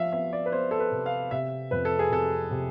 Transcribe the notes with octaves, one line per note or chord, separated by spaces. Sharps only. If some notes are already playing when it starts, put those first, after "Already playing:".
Already playing: F3 E5 F5
B3 E5
D5
B4
B3 C5
A4
B4
C3
F5
C3 E5
F2 B4
A4
G#4
C3 A4
C3